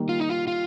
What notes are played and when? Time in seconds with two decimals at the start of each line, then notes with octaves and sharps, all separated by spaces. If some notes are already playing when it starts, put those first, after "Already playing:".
Already playing: D#3 G3 A#3
0.09 F4
0.20 D#4
0.30 F4
0.47 F4